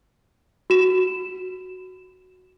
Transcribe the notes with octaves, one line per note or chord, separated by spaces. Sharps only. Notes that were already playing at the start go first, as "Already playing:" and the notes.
F#4 E7